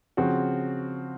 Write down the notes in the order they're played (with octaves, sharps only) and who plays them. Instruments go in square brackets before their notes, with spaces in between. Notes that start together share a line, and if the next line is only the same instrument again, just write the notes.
[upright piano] C#3 F3 C4 F#4